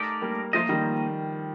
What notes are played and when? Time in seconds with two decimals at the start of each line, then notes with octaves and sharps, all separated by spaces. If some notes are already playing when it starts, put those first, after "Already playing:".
Already playing: A3 D#4 G4 A#4 D5
0.22 G3 A#3
0.53 F3 A3 A#3 F4 C5 D#5
0.69 D#3 G3